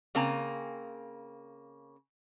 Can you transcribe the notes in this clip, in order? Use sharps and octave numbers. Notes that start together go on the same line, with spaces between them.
C#3 A#3 C4 G#5 A#5